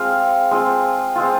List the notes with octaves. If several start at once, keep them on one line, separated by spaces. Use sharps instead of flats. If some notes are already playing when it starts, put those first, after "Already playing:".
Already playing: G#3 C4 F4 F5
G#3 C4 F4
G#3 C4 F4